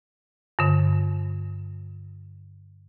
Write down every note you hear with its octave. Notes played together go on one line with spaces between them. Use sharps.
G2 D3